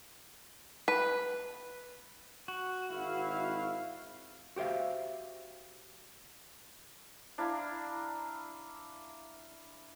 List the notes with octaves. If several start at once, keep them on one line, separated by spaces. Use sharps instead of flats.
B4
F#4
G#1 E4 F5
F#4 G4 C5 E5 F5
D4 E4 F5 A#5